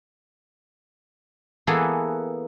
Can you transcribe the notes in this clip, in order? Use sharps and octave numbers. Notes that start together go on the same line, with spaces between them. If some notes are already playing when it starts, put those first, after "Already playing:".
E3 A#3 B3 G#4 A4